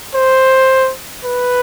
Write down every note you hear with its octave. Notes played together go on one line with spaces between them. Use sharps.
C5
B4